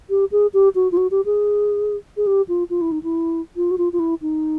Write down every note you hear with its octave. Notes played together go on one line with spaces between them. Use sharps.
G4
G#4
G4
F#4
F4
F#4
G4
G#4
G#4
G4
F4
F4
E4
D#4
E4
F4
F#4
F4
F4
E4
D#4